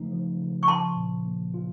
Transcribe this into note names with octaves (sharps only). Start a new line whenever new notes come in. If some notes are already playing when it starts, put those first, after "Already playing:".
Already playing: C#3 F3 A3 D#4
F3
C#3
C#6
F3 A5 C6
A#2
A#3
F4